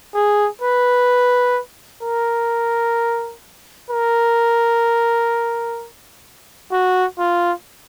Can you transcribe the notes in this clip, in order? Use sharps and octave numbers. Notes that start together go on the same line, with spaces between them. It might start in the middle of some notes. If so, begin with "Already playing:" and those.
G#4
B4
A#4
A#4
F#4
F4